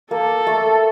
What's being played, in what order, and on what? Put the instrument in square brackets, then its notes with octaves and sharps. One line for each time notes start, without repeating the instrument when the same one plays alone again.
[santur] A#3 [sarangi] A4
[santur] A3